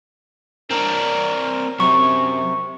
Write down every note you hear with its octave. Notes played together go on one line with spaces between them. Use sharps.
C4 D4 A#4
F#2 C3 C#6